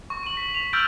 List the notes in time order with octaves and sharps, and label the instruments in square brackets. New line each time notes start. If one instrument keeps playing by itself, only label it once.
[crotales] C#6
D#7 F#7
B6
F7
E6 F6 G6 A6 D7 F#7